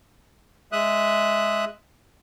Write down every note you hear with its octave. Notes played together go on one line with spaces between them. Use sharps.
G#3 E5 D#6 F#6